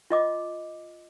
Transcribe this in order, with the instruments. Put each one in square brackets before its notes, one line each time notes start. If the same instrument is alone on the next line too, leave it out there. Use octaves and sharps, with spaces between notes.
[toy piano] F4 D#5 D6